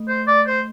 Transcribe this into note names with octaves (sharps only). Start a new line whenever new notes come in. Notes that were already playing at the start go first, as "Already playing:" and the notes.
Already playing: A3
C5
D5
C5